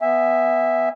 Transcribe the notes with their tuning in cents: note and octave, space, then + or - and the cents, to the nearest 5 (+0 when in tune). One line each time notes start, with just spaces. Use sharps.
B3 +0 E5 +0 G#5 -30